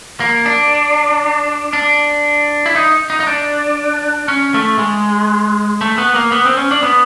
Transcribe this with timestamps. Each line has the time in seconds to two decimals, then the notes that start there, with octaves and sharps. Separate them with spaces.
0.20 A#3
0.46 D4
1.73 D4
2.66 E4
2.76 D#4
3.10 D#4
3.20 D#4
3.27 D4
4.28 C#4
4.54 A3
4.79 G#3
5.81 A3
5.98 B3
6.15 A#3
6.32 B3
6.45 C4
6.57 C#4
6.71 D4
6.83 B3